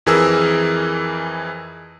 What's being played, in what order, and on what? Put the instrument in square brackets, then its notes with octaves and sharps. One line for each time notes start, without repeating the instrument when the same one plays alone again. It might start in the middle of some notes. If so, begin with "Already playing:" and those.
[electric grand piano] F2 E3 G#4 A#4 E6